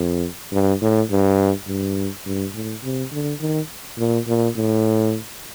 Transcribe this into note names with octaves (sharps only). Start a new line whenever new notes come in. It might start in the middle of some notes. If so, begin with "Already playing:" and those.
Already playing: F2
G2
A2
G2
G2
G2
A2
C3
D3
D#3
A#2
A#2
A2